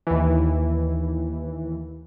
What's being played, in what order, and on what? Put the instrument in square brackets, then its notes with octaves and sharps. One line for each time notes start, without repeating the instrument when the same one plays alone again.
[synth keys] D#2 E3